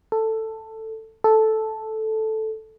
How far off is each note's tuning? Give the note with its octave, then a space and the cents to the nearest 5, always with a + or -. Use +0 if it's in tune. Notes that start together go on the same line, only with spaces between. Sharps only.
A4 +10
A4 -5